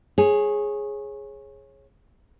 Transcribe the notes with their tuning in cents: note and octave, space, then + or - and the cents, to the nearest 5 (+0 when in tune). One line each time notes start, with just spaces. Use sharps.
G#4 +0 C#5 -25